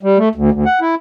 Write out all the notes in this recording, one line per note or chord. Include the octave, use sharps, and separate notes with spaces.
G3
A3
D2
D2
F#5
E4